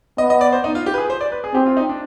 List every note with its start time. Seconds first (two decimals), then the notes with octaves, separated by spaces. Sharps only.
0.18 B3 D#5
0.30 D#5
0.41 D5
0.52 C5
0.64 D#4
0.75 F4
0.86 G4
0.94 B4
0.98 G#4
1.10 C5
1.21 D5
1.32 B4
1.44 G#4
1.54 C4 G4
1.66 F4
1.77 D#4
1.89 D4